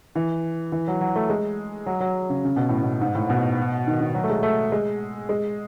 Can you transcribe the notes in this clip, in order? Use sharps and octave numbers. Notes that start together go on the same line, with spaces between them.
E3
E3
F#3
F#3
A3
G#3
F#3
F#3
C#3
C#3
B2
A2
B2
G#2
A2
B2
D#3
D#3
F#3
A3
G#3
A3
G#3
G#3